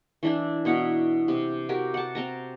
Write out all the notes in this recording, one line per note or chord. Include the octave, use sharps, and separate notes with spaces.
E3 D4 E4
B2 E4 F#5 A#5
C3
F#4 G4 A#4
F#5 A5
C4 A5 A#5